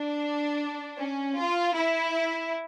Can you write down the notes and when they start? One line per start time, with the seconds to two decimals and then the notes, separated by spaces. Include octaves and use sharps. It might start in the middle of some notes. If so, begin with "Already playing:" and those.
Already playing: D4
0.98 C#4
1.36 F4
1.74 E4